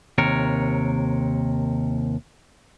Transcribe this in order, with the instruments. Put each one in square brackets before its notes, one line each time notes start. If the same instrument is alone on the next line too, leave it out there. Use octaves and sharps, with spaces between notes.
[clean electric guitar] D#2 C3 A#4 C#5